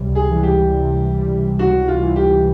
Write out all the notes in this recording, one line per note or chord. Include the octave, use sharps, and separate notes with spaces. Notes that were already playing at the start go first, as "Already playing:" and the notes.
Already playing: C#2 C3 G3
G#4
E3
G4
C3
G3
C#2 F#4
F4
E3
G4